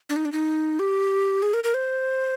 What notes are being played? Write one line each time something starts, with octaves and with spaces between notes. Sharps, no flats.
D4
D#4
D4
D#4
G4
G#4
A#4
A#4
C5